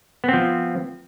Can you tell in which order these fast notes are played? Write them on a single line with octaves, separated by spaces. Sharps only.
B3 C4 F3